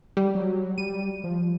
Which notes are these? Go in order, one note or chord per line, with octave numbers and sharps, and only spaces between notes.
G3
F#3
G3 D#7
F3